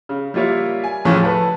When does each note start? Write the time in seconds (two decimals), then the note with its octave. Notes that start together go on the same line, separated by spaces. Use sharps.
0.09 C#3
0.34 G3 A#3 F4 C#5 E5
0.84 G#5
1.05 D#2 A2 C#3 E3 F3 C#4
1.23 A4 B4